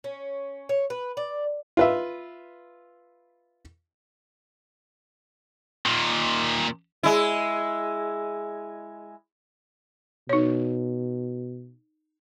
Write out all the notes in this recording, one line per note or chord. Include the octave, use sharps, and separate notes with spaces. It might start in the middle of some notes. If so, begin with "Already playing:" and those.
C#4
C#5
B4
D5
F4 B4 E5
A#2 D#3
G#3 E4
B2 D#4 C#5